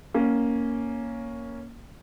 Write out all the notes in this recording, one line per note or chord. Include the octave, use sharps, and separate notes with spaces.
A#3 C#4